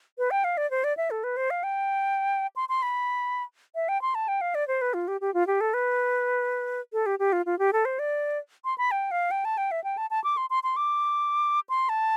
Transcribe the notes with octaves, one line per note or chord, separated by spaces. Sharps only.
B4
G5
F5
D5
C5
D5
E5
A4
B4
C5
F5
G5
C6
C6
B5
E5
G5
C6
A5
G5
F5
D5
C5
B4
F4
G4
G4
F4
G4
A4
B4
A4
G4
G4
F4
F4
G4
A4
C5
D5
C6
B5
G5
F5
G5
A5
G5
E5
G5
A5
A5
D6
C6
C6
C6
D6
C6
A5